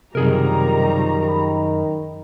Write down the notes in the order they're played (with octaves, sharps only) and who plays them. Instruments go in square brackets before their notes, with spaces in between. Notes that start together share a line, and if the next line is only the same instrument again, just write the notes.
[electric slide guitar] F#2 G#4 A#4 [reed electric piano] C3 [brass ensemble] D#3 [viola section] F3 G3 A#5
[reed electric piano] B5